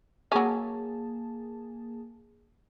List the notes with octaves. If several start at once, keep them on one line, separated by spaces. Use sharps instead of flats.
F#3 A#3 C#4 G#4 A5